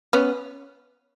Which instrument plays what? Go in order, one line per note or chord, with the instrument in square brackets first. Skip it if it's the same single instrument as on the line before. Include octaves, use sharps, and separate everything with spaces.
[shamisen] B3 C#4